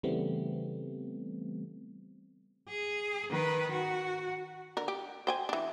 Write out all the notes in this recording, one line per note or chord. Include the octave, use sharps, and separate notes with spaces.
C#3 E3 G3 A3 B3 C4
G#4
D#3 B4
F#4
D3 A#4
G4
C5 G5 G#5
E3 D4